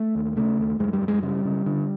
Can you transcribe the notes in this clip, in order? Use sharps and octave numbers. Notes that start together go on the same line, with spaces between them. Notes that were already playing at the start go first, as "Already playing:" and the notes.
Already playing: A3
D#2
C#3 A3
D#2
F#2 G#3
G3
F#2
G#3
C#3 G3
C#3
D3